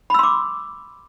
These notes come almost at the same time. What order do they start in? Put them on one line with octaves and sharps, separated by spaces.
B5 E6 C6 D6